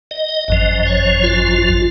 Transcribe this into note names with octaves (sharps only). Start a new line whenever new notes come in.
D#5
G#1 F#2 F3 D#5
D#5
C#5
F4
F4